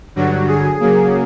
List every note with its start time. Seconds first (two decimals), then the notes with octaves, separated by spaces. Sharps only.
0.16 G2 D3 F#3 F#4
0.48 G#4
0.80 C#3 F#3 A#3